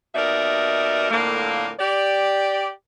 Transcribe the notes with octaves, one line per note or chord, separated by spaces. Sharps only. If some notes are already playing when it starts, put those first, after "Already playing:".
D#2 B2 D#4 A#4 D5 E5
F2 A2 D3 A#3
G4 D5